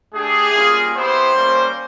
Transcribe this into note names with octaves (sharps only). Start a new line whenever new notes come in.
A3 D4 G4 G#4
G3 A#3 C#4 F4
B3 E4 G4 C5
G3 A#3 C#4